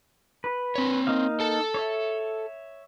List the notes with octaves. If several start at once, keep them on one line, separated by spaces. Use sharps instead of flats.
B4
C4 C#5
A#3 D#4 F5
A4 A5
C#5 E5